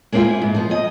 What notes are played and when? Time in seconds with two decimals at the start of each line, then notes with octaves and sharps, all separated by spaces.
0.12 G#3 A#3 C4 E4 F4
0.24 E4
0.42 G#2
0.54 F3 B3
0.70 F2 D#5